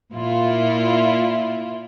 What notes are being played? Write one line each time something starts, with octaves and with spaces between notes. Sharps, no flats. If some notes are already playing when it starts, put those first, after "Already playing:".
A#2 E4 F4